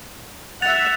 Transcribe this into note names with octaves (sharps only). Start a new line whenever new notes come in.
E5 F#5 A6 F7